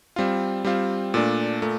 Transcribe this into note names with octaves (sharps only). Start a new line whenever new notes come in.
G3 C4 F4
G3 C4 F4
A#2 A3 D4
A#2 A3